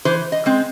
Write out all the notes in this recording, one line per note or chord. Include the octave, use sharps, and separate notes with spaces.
E3 C5
D#5
G#3 C4